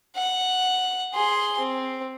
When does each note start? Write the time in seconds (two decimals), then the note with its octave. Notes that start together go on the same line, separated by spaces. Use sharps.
0.16 F#5
1.14 G#4 C6
1.59 C4